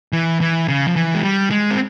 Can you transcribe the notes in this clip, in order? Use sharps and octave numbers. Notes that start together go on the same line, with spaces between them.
E3
E3
C#3
F3
E3
G#3
G3
G#3
C4